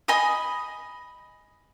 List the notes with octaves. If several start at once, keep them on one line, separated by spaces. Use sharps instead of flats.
D#5 G#5 B5 D#6